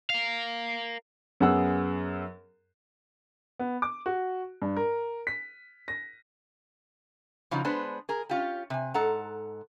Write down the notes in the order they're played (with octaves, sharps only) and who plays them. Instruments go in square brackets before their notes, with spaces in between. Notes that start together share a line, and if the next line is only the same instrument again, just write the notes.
[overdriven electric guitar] A#4 F5
[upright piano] F#2 B3 G#4 F#5 E6
B3
D6
F#4
G2
A#4
B6
A#6
[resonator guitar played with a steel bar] C#3 F3 F#3 D#4
G#3 B3 D4 B4 C5
G#4 A#4
C#4 F4 G4
C3 G#5
G#2 A4 F#5 A#5